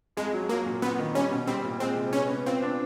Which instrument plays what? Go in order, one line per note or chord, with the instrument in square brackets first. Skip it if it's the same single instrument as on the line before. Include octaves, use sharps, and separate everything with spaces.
[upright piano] F2 [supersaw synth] G#3
[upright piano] F#3
[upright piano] F#3 [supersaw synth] A#3
[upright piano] A#2
[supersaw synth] B3 [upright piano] C4
[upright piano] D#3
[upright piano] G3 [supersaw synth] C#4
[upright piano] B2
[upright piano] G3 [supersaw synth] C4
[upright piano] A#2
[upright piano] G#3 [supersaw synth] C4
[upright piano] C3
[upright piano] B3 [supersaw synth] C#4
[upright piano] B3
[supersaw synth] C4 [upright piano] F4
[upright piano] D4